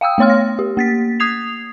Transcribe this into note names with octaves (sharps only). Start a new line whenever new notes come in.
F5 G5 D#6 E6
A3 B3 C#5 C6 F6
A#6
G4
A#3 A6 B6
D#6 G#6 C7 F7